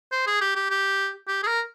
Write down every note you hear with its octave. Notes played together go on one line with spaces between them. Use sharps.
C5
G#4
G4
G4
G4
G4
G#4
A#4